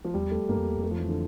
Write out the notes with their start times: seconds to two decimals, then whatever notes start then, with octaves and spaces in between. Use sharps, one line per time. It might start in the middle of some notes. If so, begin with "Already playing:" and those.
0.04 F3
0.14 E2 G3
0.31 A3
0.49 G2 A#3
0.58 F2
0.67 E2
0.77 F2
0.83 A3
0.91 F3
1.00 E3
1.08 D3